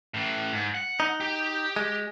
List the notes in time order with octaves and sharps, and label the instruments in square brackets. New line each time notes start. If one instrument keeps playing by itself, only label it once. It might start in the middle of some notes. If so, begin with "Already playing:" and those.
[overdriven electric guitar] A2 E3
G#2
F#5
[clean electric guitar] D#4
[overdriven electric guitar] G4
[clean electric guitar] G#3